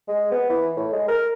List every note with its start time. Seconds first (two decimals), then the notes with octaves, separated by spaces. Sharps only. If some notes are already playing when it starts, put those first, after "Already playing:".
0.08 G#3
0.32 B3
0.50 E3
0.76 A2
0.92 G#3
1.08 A#4